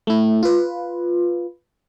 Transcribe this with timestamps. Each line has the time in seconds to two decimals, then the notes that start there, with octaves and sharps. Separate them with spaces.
0.07 A3 E4
0.43 F4 B4